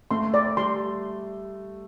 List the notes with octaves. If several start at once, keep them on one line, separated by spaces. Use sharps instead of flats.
A3 C6
D5
G3 C6